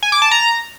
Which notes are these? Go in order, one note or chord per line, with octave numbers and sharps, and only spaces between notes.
G#5
D6
A5
A#5